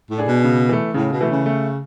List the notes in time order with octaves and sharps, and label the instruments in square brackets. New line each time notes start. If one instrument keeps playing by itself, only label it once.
[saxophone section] A2
[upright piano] D4 G#4
[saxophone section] B2
[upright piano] C#3
E3 A3
[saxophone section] A2 [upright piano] C#3
[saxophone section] B2
[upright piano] E3 A3
[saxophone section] C#3
[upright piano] A3